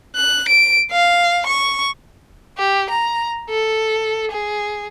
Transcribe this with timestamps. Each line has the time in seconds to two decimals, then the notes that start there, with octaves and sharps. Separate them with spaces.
0.16 F#6
0.48 D7
0.91 F5
1.46 C#6
2.58 G4
2.90 A#5
3.50 A4
4.31 G#4